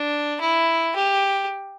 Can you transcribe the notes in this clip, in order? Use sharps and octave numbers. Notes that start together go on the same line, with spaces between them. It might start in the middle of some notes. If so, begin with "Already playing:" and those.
Already playing: D4
E4
G4